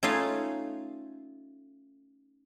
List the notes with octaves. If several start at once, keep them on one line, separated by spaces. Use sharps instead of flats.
A3 C#4 D#4 F4 F5 G#5